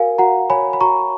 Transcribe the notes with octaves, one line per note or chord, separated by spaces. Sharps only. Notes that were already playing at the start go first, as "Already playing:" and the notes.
Already playing: F#4 A#4 F5 G#5
F#4 F#5 A#5
C#5 G#5 B5
B5
F#4 A#5 C#6